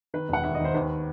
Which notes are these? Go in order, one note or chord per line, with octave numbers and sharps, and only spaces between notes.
D#3 B4
E1 F#5
D#2 E5
D#3 D#5
C5
D#2 B4